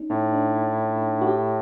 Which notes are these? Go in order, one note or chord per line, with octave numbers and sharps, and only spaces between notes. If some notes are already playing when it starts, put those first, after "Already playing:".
Already playing: C#4 D#4
A2 C#4
D4
F#4
G4